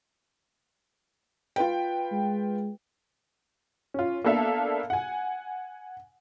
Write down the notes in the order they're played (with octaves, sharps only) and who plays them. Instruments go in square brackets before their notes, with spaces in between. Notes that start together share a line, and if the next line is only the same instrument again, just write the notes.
[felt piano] F4 B4 G5
[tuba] G#3
[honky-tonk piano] C#4 F4
A#3 B3 D4 A4 E5 F5
F#5 G#5